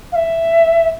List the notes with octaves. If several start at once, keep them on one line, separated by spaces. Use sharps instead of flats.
F5
E5